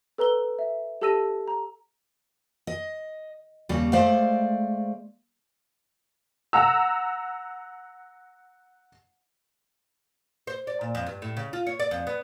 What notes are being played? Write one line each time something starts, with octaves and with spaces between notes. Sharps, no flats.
A4 B4 A#5 E6 G7
E5
G4 A4 A5 E6 A#6 D#7
A#5
D#5
D#2 C#3 G3
G#3 A3 C5 D5 F5
F#5 A#5 E6
C5
D5
A#2
F2
G2
A2
C#3
F4
C#5
D5
F2
B3